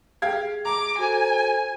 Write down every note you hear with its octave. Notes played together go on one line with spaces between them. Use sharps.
G4 G#4 F5 G#6
A#5 D6
F#4 A4 C5 G#5